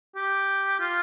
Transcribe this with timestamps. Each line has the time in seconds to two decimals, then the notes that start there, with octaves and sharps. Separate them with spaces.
0.16 G4
0.79 F4